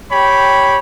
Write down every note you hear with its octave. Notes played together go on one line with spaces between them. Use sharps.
G4 C#5 G5 B5